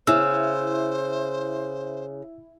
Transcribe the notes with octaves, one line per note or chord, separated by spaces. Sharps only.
C#3 E4 C5 E6